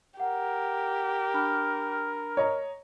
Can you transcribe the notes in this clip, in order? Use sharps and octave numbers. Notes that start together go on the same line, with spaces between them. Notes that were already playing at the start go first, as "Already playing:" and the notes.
G4 A#4 F#5
D4 B5 F6
C#5 D#5 A#5